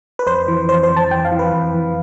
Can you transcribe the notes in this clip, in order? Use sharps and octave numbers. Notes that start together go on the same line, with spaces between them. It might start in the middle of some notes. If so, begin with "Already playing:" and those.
B4
F2 C5
E3
F2 C5
C5
E3
A5
F2 G5
F5
E3
B4
F2
E3